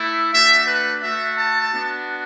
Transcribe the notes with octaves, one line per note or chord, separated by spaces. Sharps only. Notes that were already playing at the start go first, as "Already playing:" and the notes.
Already playing: A3 E4
A3 D4 F#4 E5
B4
A3 F#4 E5
A5
B3 D4 F#4